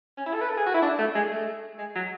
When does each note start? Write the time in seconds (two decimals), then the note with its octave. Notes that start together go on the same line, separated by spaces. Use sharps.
0.17 C#4
0.26 E4
0.34 A4
0.41 B4
0.50 A4
0.57 G#4
0.66 F#4
0.74 E4
0.82 D4
0.99 A3
1.15 G#3
1.31 A3
1.78 G#3
1.95 F#3